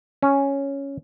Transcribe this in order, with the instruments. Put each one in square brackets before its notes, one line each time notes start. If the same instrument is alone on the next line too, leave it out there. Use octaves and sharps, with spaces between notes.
[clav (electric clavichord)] C#4